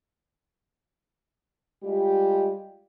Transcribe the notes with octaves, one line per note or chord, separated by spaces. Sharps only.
G3 G#3 F4 G4